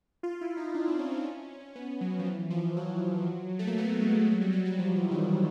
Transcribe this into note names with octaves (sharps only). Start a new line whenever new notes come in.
F4
E4
D#4
D4
C4
C#4
B3
F#3
F3
E3
F3
F#3
A3
A#3
B3
G#3
F#3
G3
F#3
F#3
F3
E3
D#3